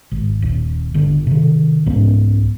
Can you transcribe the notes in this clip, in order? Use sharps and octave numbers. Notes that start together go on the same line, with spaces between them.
G#1
D#1
G1 D3
C3 D#3
C2 G#2 B3 C#4